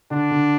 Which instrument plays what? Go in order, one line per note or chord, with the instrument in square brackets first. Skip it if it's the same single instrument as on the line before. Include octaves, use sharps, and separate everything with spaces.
[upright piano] D3 [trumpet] D4
[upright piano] D3